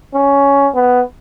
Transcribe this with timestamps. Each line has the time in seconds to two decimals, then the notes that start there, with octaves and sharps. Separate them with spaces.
0.14 C#4
0.75 B3